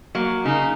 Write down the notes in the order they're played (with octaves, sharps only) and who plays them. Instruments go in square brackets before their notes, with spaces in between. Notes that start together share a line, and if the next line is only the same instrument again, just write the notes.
[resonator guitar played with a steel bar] F#3 A#3
[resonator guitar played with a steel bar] C#3 [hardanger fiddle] D#4